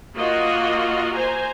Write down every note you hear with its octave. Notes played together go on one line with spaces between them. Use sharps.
A#3 F4 F#4 D#5
C5 G#5 A#5